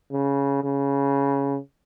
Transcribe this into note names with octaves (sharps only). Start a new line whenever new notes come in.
C#3
C#3